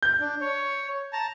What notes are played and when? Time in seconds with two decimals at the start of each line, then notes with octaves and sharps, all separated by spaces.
0.03 G6
0.20 D4
0.41 C#5
1.13 A5 A#5